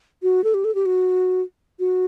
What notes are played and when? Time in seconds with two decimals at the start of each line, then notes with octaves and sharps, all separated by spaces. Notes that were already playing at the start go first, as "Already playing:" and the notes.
0.23 F#4
0.44 A4
0.54 G4
0.64 A4
0.75 G4
0.86 F#4
1.80 F#4